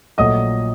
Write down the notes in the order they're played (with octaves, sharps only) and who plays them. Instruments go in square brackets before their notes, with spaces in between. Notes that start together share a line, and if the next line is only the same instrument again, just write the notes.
[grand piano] A#1 A#2 F#3 A3 D#5 D#6